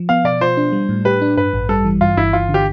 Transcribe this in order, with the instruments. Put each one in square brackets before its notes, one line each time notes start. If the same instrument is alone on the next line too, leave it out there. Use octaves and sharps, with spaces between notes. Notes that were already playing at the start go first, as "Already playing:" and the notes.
Already playing: [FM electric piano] F3
[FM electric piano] B3 [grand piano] F5
[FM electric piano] B2 [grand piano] D5
[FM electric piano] F4 [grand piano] C5
[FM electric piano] D4
G3
A2
[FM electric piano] G4 [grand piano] B4
[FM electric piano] D4
[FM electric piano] G2 [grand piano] B4
[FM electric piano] A1
[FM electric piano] G3 [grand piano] A4
[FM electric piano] E3
[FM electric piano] G2 [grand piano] F4
[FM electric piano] G1 [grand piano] E4
[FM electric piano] G1 [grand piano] F4
[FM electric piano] D3
[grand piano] G4